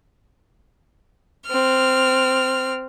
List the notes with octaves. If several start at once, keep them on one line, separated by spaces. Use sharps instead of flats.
C4 F6